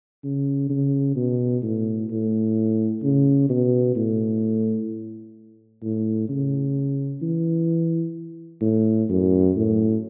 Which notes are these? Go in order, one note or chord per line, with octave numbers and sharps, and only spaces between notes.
C#3
C#3
B2
A2
A2
C#3
B2
A2
A2
C#3
E3
A2
F#2
A2